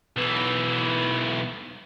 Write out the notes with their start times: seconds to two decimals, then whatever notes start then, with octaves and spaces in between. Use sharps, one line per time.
0.16 B1 E3